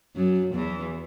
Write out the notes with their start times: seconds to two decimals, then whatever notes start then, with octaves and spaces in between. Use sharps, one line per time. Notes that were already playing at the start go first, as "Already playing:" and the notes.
0.16 F#2 F#3
0.54 E2 E3